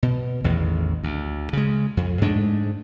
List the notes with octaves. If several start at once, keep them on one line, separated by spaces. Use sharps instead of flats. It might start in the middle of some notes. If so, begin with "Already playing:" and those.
B2
A1 E2 D#3
D2
C#3 G#3
F2
G#2 G#3 A3 D4